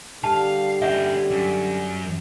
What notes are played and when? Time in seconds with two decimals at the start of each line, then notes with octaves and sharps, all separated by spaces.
0.24 D3 G3 F5 A5
0.82 C#4 E5 F#5 G5
1.31 F#2